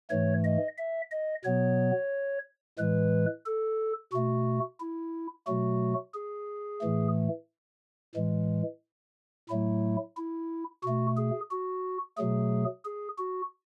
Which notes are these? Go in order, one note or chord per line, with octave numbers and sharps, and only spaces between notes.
G#2 E3 A3 C#5
D#5
E5
D#5
B2 F#3 B3 C#5
A2 E3 G#3 B4
A4
B2 A3 F#4
E4
B2 F#3 A3 F#4
G#4
A2 E3 A3
A2 E3 G#3
A2 F#3 A3 E4
E4
B2 A3 F#4
G#4
F#4
B2 F#3 A3 G#4
G#4
F#4